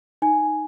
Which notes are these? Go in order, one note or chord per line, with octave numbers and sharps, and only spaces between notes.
D#4 G#5